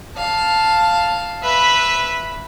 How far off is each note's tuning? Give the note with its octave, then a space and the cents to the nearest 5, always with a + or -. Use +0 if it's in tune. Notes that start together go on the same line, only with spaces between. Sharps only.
F5 +0 A5 +0
B4 -5 E5 +0